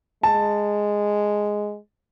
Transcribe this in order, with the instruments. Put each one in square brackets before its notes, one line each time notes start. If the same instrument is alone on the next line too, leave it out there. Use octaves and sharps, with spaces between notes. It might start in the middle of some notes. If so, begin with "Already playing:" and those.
[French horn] G#3 [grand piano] A5